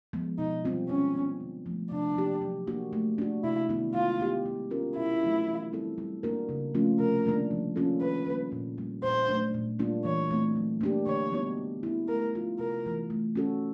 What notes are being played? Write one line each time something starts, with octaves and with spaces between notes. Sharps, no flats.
F3 G#3 B3
B2 D#4
G3 C4 F4
G#3 C#4
B3 D4
D3
F3 A3
C3 D4
F3 A#3 D#4 G4
F#3
A#3 D4 F#4
A3
D4 F#4
C3 E4
D#3 G#3 B3 E4
G#3 F4
B3 D#4 G4
G#3
C#4 F4 A#4
B2 E4
F#3 A3 D4 F4
E3
G3 C4 E4 A4
G3
A#3 D4 F#4 A#4
C#3
F3 A3 C#4 F4
C3 A#4
D#3 G3 A#3 D4
F3
A#3 C#4 F4 A4
D#3 B4
G3 A#3
A#2
G3 A#3
A#2 C5
F#3 A3 D4
A#2
G3 A#3 D4 F4
E3 C#5
A3 C4
F#3
A#3 D4 G4
D3 C#5
G3 B3 D#4 F#4
G3
B3 E4
A3 A#4
D4 F4
C3 A#4
E3 A3
A3
C#4 F#4 A4